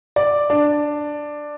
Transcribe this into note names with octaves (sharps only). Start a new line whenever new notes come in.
D5
D4